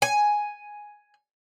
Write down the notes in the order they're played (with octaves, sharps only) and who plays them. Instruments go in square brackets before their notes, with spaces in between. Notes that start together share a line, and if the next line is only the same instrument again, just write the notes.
[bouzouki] G#5